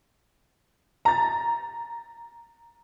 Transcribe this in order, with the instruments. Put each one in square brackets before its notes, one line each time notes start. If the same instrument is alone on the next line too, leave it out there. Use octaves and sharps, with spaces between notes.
[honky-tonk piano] A#5 A6